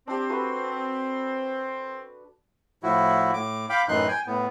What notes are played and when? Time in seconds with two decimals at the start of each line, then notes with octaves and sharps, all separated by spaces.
0.08 C4 D4 G4
0.30 F#4 A4 B4
2.83 A2 F3 E4 F#4
3.34 A2 D6
3.69 F5 G5 B5 D6
3.88 F#2 A2 E3 D#4 C6 F#6
4.08 G5 G#5
4.27 A2 B3